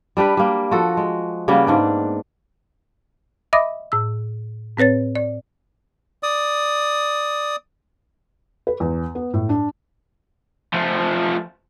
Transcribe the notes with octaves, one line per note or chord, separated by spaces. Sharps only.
G3 D4 G4 B4
G3 A#3
F3 F#4 A4
G#3
C#3 G3 A#3 B3
G#2 D4 D5
D#5 E5 B5 D6 D#6 A#6
A2 E6
A2 C4 B4 C#5 A6
D5
D5 D#6
B4
E2
B3
A2
D4
F3 A3